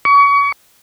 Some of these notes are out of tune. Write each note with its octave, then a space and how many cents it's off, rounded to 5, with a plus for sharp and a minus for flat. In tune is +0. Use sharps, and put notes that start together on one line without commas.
C#6 +35